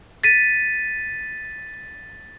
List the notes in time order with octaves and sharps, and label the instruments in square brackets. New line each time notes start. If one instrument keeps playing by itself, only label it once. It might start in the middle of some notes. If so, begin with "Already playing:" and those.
[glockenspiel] A6 B6 D#7